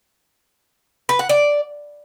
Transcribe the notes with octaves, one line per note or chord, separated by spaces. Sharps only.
B4
F#5
D5